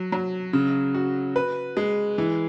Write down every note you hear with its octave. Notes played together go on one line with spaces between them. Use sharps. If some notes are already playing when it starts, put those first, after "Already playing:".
Already playing: F#3
F#3
C#3
F#4
B4
G#3
E3